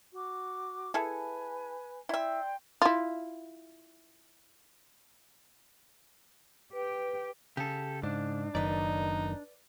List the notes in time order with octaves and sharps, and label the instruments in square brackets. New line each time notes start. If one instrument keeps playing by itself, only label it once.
[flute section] F#4 D6
[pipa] E4 G#4 A4 [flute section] B4 G#5
[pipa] E4 E5 [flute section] D5 G5 C6
[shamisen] E4 F4
[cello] G4 G5 [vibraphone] B4
[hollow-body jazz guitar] C#3 [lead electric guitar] G4 A4
[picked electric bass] G#2 [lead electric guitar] D4
[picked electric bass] F#1 F#2 D#3 [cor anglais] D#4 [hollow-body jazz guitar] B4 D5